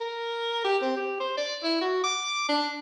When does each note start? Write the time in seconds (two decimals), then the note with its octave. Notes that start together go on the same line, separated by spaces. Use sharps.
0.01 A#4
0.64 G4
0.82 C4
0.97 G4
1.20 C5
1.37 D5
1.63 E4
1.81 F#4
2.04 D6
2.49 D4